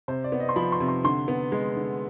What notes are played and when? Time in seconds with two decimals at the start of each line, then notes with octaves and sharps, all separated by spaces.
0.08 C3 C5
0.24 D5
0.32 B3
0.40 D#5
0.49 C6
0.56 F3 B5
0.72 C6
0.80 C3
0.88 C6
1.04 D3 C6
1.28 B3
1.52 G#3
1.76 D3